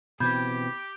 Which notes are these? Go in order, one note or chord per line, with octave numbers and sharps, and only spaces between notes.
B2 E3 C4 G4 B5 G6 G#6